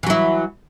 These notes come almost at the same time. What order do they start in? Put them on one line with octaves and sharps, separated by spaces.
E3 F#3 E4